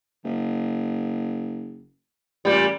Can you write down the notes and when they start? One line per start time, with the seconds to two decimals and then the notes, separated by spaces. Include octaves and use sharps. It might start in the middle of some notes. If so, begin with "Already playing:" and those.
0.24 F#1
2.45 A1 A#2 G3